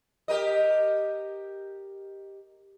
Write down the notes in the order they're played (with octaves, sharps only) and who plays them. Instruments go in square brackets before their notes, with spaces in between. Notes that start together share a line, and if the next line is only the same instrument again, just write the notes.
[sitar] G4 A#4 D#5